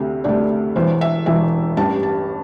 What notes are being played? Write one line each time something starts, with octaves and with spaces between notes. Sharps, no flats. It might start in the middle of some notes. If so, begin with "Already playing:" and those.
Already playing: D2 C3 A3
D2 C3 A3 D5
E1 E2 E3 C5
E5
E1 E2 E3 E5
A1 G2 G3 A5
A5